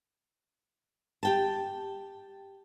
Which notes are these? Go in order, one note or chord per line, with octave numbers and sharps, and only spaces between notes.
G4 G5 A5